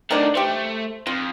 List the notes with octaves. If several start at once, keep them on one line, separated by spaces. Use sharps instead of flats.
D#3 F#3 A3 D4 D#4
A3 G4 C5
F2 F4